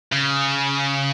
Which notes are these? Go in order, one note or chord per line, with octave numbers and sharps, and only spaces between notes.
C#3